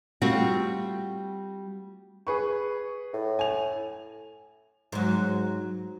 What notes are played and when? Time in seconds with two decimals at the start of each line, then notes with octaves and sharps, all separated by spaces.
0.22 G3 A3 C4 F4 F#4
2.27 G#4 B4 C#6
3.13 A2
3.39 G#5 F7
4.92 G#2 F#3